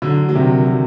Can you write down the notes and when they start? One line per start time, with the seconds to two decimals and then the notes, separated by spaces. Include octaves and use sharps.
0.02 D3 F#3
0.29 F#3
0.35 C3 D#3
0.67 D3 F#3